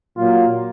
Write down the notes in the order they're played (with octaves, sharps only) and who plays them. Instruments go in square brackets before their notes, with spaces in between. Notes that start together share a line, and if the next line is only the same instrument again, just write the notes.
[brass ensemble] A#2 F#3 A#3 F4